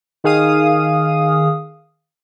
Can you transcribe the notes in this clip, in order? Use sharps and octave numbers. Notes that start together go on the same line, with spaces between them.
D#3 G#4 F5 D#6